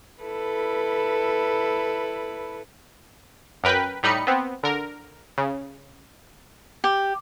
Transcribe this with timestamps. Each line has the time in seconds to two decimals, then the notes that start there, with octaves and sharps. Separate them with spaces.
0.22 E4 A4 B4
3.64 F#2 A#4 B4 G5 B6
4.03 A2 G3 D#4 B5 C#7
4.27 B3 C4
4.63 D3 A#4
5.38 C#3
6.84 G4